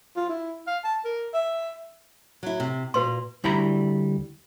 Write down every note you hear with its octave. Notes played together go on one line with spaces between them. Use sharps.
F4
E4
F5
A5
A#4
E5
F#3 E4
C3
A#2 F#4 B4 C6
D2 G3 E4 A#5 B5